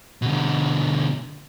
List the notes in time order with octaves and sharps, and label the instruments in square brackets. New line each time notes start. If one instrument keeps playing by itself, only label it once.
[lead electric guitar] B2 D3